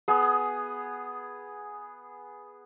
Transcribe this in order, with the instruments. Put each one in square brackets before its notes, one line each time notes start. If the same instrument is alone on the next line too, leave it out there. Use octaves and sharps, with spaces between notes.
[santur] B3 G#4